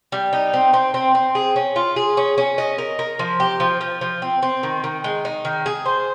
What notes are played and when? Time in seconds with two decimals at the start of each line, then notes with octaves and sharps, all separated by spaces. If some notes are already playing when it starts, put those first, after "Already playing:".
0.12 G3
0.33 D#4
0.54 C4
0.73 C4
0.94 C4
1.15 C4
1.35 G#4
1.56 C#4
1.76 F4
1.96 G#4
2.17 C#4
2.38 C#4
2.58 D#5
2.78 A#4
2.99 A#4
3.19 F3
3.40 G4
3.60 F3
3.81 F3
4.01 F3
4.22 C4
4.43 C4
4.63 D#3
4.84 D#3
5.04 G#3
5.25 D#4
5.45 D#3
5.66 G#4
5.86 C5